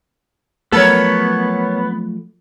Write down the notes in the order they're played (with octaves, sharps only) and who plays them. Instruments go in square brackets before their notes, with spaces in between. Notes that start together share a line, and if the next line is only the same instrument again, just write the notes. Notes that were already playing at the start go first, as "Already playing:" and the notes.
[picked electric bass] F3 F#3 A3 [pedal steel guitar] B3 [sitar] A4 A#4 C#5